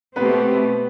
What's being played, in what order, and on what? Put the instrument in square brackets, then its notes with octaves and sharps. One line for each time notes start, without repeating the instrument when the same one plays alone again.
[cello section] B2 A3 C4 G4 [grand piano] B3 B4